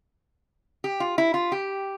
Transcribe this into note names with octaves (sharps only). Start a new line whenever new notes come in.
G4
F4
E4
F4
G4